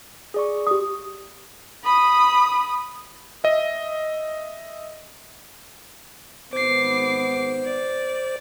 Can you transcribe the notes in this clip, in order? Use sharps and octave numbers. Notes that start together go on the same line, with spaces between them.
G#4 D5 C#6
G4 D#6
B5 D#6
D#5 E5
G#1 B3 C5 D6 C7
D5